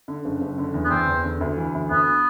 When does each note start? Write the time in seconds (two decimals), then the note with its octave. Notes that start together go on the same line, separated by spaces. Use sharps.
0.08 D3
0.25 F#1
0.41 F#1
0.58 D3
0.74 E2
0.85 B3
0.90 E2 C4
1.07 E2
1.23 D3
1.41 D2
1.57 E3
1.74 D2
1.90 D2 B3